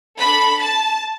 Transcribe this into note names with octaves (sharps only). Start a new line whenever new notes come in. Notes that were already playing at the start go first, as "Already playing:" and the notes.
D4 A4 B5
A5